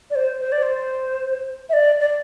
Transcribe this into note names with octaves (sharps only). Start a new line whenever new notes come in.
D5
C5
C5
D5
C5
E5
D5
D5